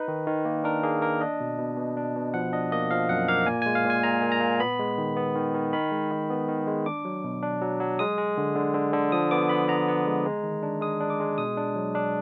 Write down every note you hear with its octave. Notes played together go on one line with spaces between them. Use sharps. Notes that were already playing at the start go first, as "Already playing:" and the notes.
Already playing: D#4 B4
D#3
D#3
A#3
D4 A#4
A#3 G#4
A#3 A#4
D4 D#5
B2
B2
B2
D4
B2
F3 F#5
D4 D#5
A#3 D#5
F3 F5
F#2 F#5
A#3 F5
A#2 G#5
G#3 G#5
F5
A#2
G#5
A#2 A#5
A#2
A#5
A#2
B3 B5
G#3
D#3
B3
D#3
D#3
D#3 B5
G#3
D#3
B3
D#3
G#3
D4 D6
F#3
B2
D4
F#3
F#3
G#3 D#6
G#3
D3
D3
D3
D3
F3 D#6
B3 D6
B3 B5
B3 A#5
B3
G#3
G#3
D#3
D4
G#3 D#6
D4
D6
G#3
B2 D#6
D4
F#3
D4